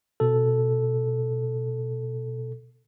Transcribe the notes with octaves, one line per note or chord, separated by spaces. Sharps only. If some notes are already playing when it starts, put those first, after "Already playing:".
B2 A4